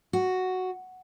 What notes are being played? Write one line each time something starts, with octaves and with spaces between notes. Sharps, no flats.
F#4